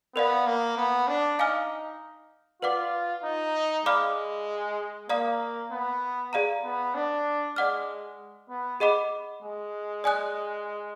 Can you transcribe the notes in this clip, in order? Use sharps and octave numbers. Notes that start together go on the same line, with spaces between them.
B3 A#4 D5 F5
A#3
B3
D4
D#4 F5 G#5 D6 F6
F4 B4 D5 F#5 D6
D#4
G#3 D5 F5 B5 D6 F6
A#3 D5 F5 A#5 D#6
B3
G#4 D5 F5 A#5
B3
D4
G#3 D5 F#5 D6 F6
B3
G#4 D#5 F#5 B5 D6
G#3
D5 G#5 D#6 F#6